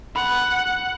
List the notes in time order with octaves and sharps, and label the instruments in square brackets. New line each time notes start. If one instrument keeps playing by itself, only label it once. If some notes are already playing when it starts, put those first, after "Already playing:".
[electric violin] F#5 [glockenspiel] B5